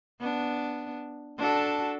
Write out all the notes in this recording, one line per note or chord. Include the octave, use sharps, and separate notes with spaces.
B3 D4
D4 F#4 A4